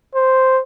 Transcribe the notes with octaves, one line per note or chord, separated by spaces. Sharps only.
C5